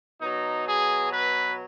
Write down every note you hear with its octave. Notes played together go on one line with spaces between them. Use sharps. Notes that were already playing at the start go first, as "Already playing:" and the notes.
B2 F#3 D#4
G#4
B4